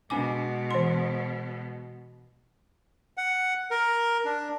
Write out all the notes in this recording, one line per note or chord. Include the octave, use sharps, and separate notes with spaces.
B2 G#3 D4 G#5 D6
E3 C6
F#5
A#4
D4